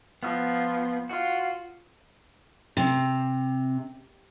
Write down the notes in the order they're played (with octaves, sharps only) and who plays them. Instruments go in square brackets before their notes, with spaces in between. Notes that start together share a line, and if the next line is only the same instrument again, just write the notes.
[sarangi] F3 [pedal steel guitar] B3
[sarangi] F4 [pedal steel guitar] F#4
[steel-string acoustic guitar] C3